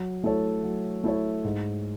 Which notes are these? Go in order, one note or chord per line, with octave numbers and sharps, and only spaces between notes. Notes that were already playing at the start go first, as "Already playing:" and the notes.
Already playing: F#3
A3 E4 A4 C#5
F#3
A3 E4 A4 C#5
G#2